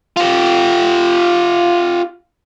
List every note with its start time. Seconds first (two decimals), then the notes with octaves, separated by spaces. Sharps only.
0.16 F4 G4